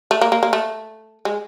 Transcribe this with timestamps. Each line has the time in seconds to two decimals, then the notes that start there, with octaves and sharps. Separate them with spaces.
0.11 A3
0.21 A#3
0.32 A#3
0.43 A#3
0.53 A3
1.25 G#3